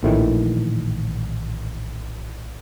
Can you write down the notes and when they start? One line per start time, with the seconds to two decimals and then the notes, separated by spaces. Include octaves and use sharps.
0.03 A#1 A2 D#3 E3